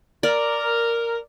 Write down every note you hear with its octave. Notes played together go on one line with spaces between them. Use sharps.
A#4 D5